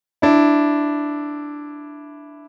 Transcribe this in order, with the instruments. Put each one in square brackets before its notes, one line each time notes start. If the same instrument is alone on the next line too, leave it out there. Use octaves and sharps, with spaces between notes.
[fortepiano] D4 E4